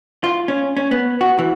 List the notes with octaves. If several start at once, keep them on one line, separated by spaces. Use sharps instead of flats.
F4
C#4
C#4
B3
F#4
E3